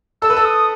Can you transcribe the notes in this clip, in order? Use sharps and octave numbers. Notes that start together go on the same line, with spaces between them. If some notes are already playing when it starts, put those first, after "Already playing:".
A4 E6
B4
A4
D#6